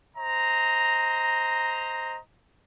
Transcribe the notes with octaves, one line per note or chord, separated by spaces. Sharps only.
C5 D#5 A#5